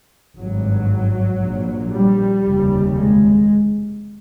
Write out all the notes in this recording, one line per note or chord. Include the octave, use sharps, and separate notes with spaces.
G#1 G2 F#3
A#1 A#2
G3
F1 D#2 C#3
G#3